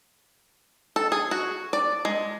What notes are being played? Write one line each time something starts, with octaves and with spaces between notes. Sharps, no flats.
A4
G#4
F#4
D5
G#3